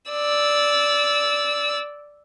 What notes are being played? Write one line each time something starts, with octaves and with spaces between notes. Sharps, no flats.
D5 E6